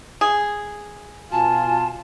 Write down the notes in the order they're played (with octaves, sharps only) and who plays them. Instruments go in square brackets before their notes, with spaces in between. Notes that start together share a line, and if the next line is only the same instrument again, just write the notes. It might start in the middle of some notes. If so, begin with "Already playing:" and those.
[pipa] G#4
[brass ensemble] B2 F4 [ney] G#5 [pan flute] A5